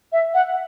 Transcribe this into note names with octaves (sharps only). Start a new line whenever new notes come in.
E5
F#5